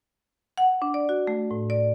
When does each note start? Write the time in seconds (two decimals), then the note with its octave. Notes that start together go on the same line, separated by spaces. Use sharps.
0.58 F#5
0.82 D4
0.94 D5
1.09 F#4
1.27 A3
1.51 A2
1.70 D5